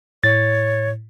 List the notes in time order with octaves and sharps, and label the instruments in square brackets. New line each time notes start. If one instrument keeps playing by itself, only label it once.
[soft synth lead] A2 [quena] C#5 [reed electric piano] A6